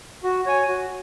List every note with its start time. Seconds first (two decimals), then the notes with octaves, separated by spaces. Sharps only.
0.23 F#4
0.46 C#5 G#5
0.68 F#4